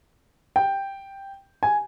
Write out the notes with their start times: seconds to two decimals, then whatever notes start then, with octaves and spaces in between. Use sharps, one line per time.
0.56 G5
1.63 G#5